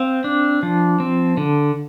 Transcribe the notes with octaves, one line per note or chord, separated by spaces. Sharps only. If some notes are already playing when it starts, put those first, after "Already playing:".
Already playing: C4 F5
D4
F3
C4
D3